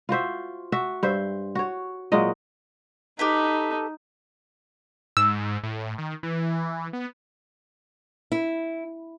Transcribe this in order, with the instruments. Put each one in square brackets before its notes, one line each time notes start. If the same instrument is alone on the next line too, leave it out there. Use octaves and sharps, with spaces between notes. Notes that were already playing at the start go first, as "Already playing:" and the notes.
[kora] F4 F#4 C5 E5
F#4 E5
G2 C5 E5
F#4 C#5
A#2 F#3 G#3 D#5
[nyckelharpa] D#4 [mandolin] G4 A4 B4
[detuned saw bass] G#2 [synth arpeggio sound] E6
[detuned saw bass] A2
D#3
E3
B3
[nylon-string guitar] E4